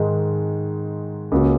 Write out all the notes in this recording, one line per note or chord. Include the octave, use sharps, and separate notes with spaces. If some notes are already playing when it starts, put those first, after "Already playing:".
Already playing: G#2 D#3 G#3
C#2 C#3 A#3 F#4